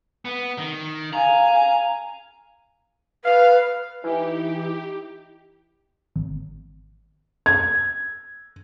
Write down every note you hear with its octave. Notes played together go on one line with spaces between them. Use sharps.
B3
D#3
F5 G#5 A#5
B4 F5
E3 D#4 E4 G4
G#1
G#6